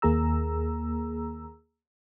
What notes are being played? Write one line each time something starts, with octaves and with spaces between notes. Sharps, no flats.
D#2 A#3 G#4 A#5 E6